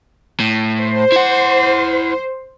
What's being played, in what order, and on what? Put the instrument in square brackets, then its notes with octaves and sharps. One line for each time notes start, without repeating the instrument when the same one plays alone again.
[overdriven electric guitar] A2
[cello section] C5
[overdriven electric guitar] E4 F#5